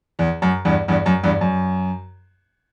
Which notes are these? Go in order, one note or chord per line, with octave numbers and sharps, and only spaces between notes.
E2
F#2
E2 G2
E2 G2
F#2
E2 G2
F#2